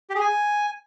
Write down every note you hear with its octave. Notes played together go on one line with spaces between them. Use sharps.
G4
G#4
G#5